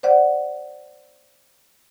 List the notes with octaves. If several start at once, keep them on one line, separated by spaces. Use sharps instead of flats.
C5 D5 F#5